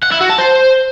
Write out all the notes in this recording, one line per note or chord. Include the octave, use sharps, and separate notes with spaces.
F#5
E4
F#4
A5
C5